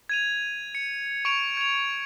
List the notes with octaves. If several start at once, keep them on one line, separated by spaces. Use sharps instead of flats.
G#6 D#7 F7
C#7
C#6 D7 F7
G#6 F7